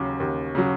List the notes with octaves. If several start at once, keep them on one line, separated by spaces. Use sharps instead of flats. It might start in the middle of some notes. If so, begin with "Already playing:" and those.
Already playing: D#2 C#3 F#3
D#2
C#3 F#3